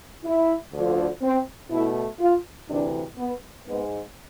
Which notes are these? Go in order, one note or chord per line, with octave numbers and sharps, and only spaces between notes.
E4
D2 D3 F3
C4
B2 A3 E4
F4
D2 C3 E3 D4
B3
G#2 G#3 B3